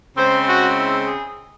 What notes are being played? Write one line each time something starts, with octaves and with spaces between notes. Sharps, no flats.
C#3 G#3 C4 C5
F#4
E4
G#4